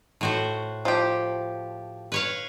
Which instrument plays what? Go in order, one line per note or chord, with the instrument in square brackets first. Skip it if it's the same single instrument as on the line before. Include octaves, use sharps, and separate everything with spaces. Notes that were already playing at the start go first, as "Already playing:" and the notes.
[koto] A2 F#4 C5
[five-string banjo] F3 G4
[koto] B4 C#5 F5